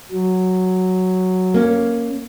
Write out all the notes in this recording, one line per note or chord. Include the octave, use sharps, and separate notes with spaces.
F#3
A#3 C#4